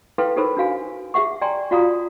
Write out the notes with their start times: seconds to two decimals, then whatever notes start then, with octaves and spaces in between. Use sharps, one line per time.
0.18 E4 A4 B4 F5 G5 C6
0.36 D#4 G4 A4 A#4 C5 B5
0.57 D4 F#4 F5 G#5
1.14 G4 G#4 E5 F#5 C#6
1.42 D5 G5 G#5 A#5 C6
1.71 F4 F#4 D5 F5 A#5 D#6